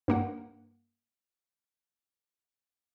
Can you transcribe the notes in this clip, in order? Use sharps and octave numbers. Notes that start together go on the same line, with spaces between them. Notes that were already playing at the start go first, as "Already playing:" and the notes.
G2 A#3 F#5